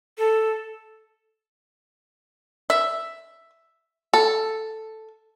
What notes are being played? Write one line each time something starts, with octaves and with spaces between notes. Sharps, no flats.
A4
E5
A4